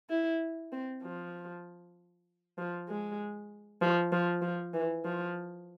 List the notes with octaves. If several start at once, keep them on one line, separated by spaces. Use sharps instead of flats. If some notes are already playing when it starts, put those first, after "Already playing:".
E4
C4
F3
F3
G#3
F3
F3
F3
E3
F3